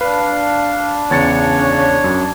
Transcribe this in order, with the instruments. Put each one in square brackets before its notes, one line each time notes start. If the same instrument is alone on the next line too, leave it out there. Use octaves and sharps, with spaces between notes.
[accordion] D4 [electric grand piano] B4 [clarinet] F5
[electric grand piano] E2 A6 C#7 [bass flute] C#3 [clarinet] C#5
[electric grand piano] F#2